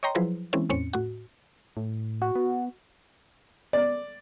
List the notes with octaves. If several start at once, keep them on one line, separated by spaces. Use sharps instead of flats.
C#5 D#5 G5 A#5 C6
F3 F#3 E4 G#4 B4 C5
E3 G#3 A#3 C4 C#4 E4
E2 A2 C4 C#4 C#7
A2 F#4
A2
F#4
B3
D5